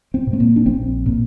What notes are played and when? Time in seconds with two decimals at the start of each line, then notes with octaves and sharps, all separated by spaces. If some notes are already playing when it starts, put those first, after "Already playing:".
0.14 C4
0.27 A#2
0.33 A3
0.40 A#3
0.56 D4
0.66 A#1 C4
1.06 A#2